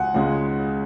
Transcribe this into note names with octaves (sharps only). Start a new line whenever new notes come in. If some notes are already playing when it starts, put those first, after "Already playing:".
Already playing: C#2 C#3 F#5 G#5
C#2 C#3 G#3